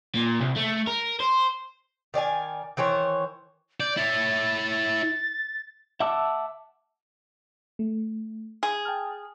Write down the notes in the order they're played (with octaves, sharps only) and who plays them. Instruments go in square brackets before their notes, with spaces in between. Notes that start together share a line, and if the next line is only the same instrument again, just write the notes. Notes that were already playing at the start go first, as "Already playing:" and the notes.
[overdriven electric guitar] A#2
C2
A3
A#4
C5
[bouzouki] D#3 D5 F5 G#5
D#3 E3 C5 C#5
[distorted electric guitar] D5 [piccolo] G6
[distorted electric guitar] E4 C#5 [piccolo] A6
[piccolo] A6
[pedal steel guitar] E5 F#5 A5 D6 E6
[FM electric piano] A3
[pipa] G#4
[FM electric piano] G5 A5 F6